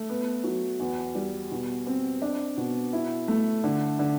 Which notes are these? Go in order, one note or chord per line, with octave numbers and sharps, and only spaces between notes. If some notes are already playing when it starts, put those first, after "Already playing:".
Already playing: A3
B3
F#3
E2
G3
B2
C4
D4
B2
E4
A3
D3
D3